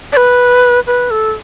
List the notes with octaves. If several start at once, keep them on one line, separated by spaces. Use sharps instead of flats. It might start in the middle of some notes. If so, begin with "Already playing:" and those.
D5
B4
B4
A4